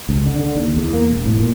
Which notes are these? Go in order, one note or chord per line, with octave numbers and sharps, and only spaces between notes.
C#2
D3
D3
D#2
E2
A#3
E1
A2
A#2